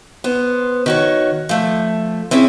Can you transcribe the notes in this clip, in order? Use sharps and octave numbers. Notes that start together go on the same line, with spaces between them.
B3 C5
D#3 F#4 C#5
F3 A3
C4 C#4 E4 G#4